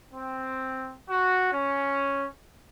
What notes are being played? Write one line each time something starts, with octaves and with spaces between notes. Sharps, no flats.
C4
F#4
C#4